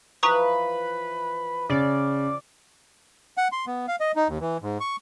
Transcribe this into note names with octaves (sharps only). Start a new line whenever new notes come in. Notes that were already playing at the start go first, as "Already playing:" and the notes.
E3 F3 B4 A#5 C#6 D#6
C#3 D5
F#5
C6
B3
F5
D#5
D#4
D#2
E3
G#2
C#6